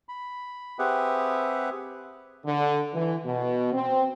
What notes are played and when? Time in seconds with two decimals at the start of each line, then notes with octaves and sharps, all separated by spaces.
0.09 B5
0.79 C4 G4 G#4 B4 E5 F#5
2.46 D3
2.93 E3
3.25 B2
3.73 C4